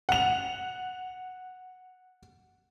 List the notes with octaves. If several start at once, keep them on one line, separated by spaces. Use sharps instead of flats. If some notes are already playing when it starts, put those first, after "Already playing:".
F#5 F7